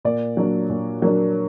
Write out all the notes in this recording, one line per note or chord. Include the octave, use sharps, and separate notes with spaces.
A#2 D5
F#3 A#3 D4
A#2
F#3 A#3 D4